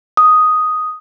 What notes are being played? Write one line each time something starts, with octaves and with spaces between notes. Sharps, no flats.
D#6